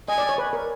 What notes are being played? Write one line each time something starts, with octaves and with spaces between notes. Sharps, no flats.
D#5 G#5
D5
C#5
B4
A#4